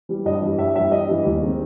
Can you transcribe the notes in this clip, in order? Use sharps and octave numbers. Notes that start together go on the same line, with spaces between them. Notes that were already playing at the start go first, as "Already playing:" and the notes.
E3 G3
G2 D#5
E3 G3
G2 E5
E3 G3 E5
G2 D#5
E3 G3
D#2
D#3 G#3 C4